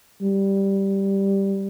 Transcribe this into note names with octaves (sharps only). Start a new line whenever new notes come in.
G3